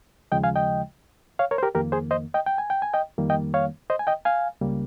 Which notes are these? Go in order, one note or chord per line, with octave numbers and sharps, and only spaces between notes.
D#2 C#3 F3 G#3 D#5 G5
F5 G#5
D#5 G5
C#5 F5
A#4 C#5
C5
G4 A#4
F2 D#3 A#3 G4 A#4
G#4 C5
C5 D#5
D#5 G5
G5
G#5
G5
G#5
D#5 G5
F2 D#3 G3 A#3
D#5 G5
C#5 F5
C5 D#5
G#5
D#5 G5
F5 G#5
C#2 C#3 G3 A#3